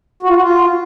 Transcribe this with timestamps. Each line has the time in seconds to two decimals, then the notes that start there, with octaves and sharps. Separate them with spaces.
0.23 F#4
0.29 F4
0.35 F#4
0.42 F4